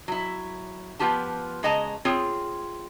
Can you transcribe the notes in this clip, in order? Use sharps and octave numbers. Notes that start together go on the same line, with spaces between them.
F#3 E4
F3 B3 F4 G4 A5
C#3 G#3 D#5 A5 A#5
C4 F4 G#4 C#5